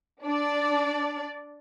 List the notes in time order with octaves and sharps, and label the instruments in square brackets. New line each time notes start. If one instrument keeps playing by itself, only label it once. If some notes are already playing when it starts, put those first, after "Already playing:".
[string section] D4 D5